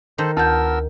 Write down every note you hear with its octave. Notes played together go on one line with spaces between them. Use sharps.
D#3 A4 C5
D2 B3 F4 A#4 A5 E6 G6